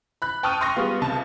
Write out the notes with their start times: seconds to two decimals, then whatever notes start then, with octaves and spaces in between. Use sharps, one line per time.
0.22 B5 F#6
0.43 G5 A5 C#6 D#6 F6 D#7
0.61 C6 C#6 F6 A#6
0.76 G3 G#3 B3 F4
1.01 C#2 C3 A5